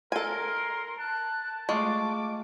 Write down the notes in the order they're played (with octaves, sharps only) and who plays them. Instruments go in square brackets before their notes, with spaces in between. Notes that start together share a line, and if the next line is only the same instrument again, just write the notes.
[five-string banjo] A4 G#5 [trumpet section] A#4 [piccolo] C6
[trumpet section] A5 [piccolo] F#6
[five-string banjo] G#3 [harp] A3 F4 C#6 [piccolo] D6